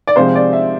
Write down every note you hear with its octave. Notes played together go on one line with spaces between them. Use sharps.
D5
C3 F3 G#3 C5
D5
E5